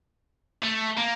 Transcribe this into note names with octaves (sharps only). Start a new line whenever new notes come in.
A3
A#3